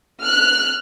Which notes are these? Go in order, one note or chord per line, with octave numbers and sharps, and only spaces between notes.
F6 F#6